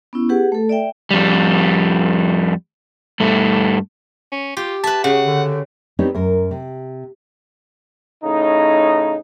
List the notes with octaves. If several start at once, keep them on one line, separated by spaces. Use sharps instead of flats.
B3 C#4 E4
G4 G#4 B4 F#5
A3 A4
D5 E5 G5
F2 G3
G2 A3
C#4
F4 G4
B4 E5 A5
C#3 F#5
D3
B3 C4 D4 D#4 G4 C#5
F#2 A#4
C3
A2 C#3 D#4